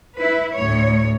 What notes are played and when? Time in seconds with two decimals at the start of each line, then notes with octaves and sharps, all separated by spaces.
0.15 E4 B4
0.53 D2 A2 C#5